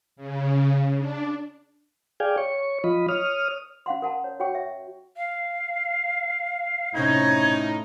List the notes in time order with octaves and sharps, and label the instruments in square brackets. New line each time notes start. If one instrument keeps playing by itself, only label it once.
[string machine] C#3
D4
[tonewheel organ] G#4 D5 F5 G5 G#5
C#5 C#6
F3 F4 D#5 B5
C#5 D#6 F6
[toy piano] C#4 F5 F#5 C6
A#4 F#5 A5 A#5
C#5
F#4 C#5 F#5 G5 C#6
C#5 E5
[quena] F5
[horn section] A2 D#4 [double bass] C3 C#4 [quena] G#6